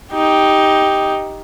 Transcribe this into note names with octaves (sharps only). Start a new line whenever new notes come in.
D#4 G4